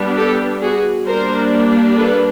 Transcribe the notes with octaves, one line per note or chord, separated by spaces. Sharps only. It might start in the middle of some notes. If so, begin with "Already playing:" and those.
Already playing: G3 B3 D4
G4 A4
F#4 G#4
G3 A#3 D4 A#4 C5
A4 B4